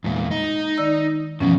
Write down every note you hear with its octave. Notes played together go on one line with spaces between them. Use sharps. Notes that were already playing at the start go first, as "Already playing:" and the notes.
E2 A#2 G#3
D#4
D#3 D5 E6
F#2 B2 E3 F3 C#4